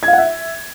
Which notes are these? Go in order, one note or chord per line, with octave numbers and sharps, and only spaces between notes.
G#6
F5
F#5
E5